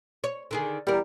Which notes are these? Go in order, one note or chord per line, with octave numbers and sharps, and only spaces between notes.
C#5
D3 D#3 G#4
E2 G3 A#4